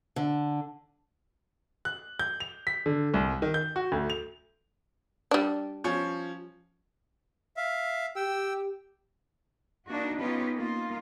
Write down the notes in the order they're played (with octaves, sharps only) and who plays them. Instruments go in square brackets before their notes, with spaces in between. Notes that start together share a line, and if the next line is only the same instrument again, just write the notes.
[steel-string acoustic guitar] D3
[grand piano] F#6
G6
F7
B6
D3
C2
D#3
G6
F#4
D2
F7
[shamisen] G3 D4
[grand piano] F3 C#4
[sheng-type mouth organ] E5 F5
[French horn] G4 [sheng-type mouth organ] G5 E6
[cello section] A#3 D4 D#4 F#4
B3 C#4 D#4 F4 G4 B4
A#3 D#4 F4